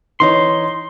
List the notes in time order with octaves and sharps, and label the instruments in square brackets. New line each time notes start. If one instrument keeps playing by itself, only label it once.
[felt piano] E3 D#4 C#5 [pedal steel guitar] C6